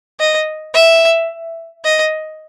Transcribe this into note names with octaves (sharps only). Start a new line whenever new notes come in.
D#5
E5
D#5